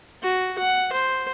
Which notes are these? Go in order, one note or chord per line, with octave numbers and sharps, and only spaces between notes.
F#4
F#5
C5